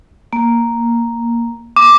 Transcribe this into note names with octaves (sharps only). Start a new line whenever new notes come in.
A#3
D6